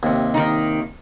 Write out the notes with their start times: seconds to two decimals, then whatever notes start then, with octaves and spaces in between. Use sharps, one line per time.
0.03 D#2 C3
0.34 D#3 D#4